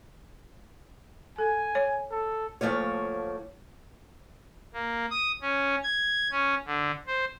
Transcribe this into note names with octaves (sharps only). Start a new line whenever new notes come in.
A4 G#5
C#5
A4
D2 F3 A3 A#3 C#5
A#3
D#6
C#4
G#6
C#4
D3
C5